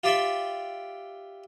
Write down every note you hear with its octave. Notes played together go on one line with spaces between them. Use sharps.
F4 G4 D5 E5